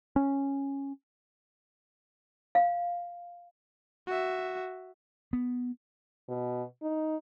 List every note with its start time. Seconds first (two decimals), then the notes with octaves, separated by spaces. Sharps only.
0.16 C#4
2.55 F5
4.07 F#4 E5
5.33 B3
6.28 B2
6.82 D#4